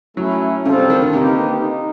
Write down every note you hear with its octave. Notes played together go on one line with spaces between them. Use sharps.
F#3 A3 C#4 E4
C#3 G3 C4 F4 A4 C5
C3
D#3
D3
C3 A#3 D#4 G4 B4
D#4